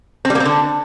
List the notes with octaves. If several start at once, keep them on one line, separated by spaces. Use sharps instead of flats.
C4
G3
A#3
C4
D3